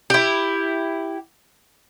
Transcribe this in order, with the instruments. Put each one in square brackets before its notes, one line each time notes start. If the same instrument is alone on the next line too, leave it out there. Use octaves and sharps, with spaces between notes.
[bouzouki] E4 G4